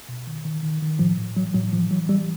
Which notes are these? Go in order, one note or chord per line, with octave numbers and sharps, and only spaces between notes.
B2
D#3
D#3
D#3
D#3
A2 F3
A2
E3 F#3
A2 F#3
E3 F3
E3 F#3
E3 G3